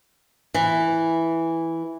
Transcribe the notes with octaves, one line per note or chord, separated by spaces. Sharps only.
E3